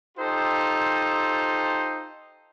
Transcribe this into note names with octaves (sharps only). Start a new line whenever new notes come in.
D#4 F4 G4 A4 C5